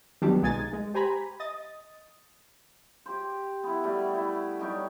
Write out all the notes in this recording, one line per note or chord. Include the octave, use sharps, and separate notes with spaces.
D#3 F#3 G3 B3 D4
B1 G#3 D#4 G#5 G#6 A6
G#3
G4 C5 G#5 A#5 B5
D#5 D#6 A6
G4 C5
B3 E4
G3 A3 F#4
E4
G3 D#4 G4 C#5